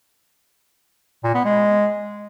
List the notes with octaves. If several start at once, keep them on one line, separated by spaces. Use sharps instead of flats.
A#2
B3
G#3